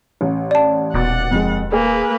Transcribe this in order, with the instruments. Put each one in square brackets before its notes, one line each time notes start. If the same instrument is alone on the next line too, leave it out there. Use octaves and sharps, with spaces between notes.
[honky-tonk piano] A1
[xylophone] D5 A5
[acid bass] D#1 [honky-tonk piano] B2 D6 A6 [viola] F#5
[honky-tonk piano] F2 G#3
[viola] A#3 B4 [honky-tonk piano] G#4 A4